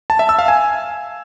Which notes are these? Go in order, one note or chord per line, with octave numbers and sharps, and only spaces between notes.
A5
E5
E6
F5
G#5